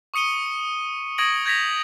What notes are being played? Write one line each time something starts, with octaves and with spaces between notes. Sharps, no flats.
C#6 D#6 C#7 D#7 G7
C#6 D#6 G#6 A#6 D7 F#7
G6 G#6 A#6 B6 F7